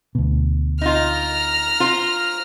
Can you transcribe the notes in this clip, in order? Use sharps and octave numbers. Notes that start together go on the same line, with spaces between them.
D2 B2
D#4 F4 A#5 F6
F4 C5